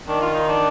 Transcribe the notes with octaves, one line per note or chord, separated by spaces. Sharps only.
D#3 D4
F4
D#4
D4